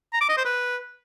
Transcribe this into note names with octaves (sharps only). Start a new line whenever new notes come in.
A#5
D6
D#5
C5
B4